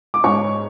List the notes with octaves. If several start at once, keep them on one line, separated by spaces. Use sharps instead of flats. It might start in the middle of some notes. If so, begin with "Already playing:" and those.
D6
G#2 C#5 C#6